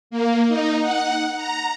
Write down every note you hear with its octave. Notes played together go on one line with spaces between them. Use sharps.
A#3
D#4
F#5
A#5